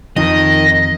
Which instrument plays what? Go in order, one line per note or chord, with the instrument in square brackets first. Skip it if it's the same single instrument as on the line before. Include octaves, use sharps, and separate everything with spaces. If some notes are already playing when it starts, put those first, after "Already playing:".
[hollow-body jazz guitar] F2 [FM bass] D#3 [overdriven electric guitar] D#5 [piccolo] A#6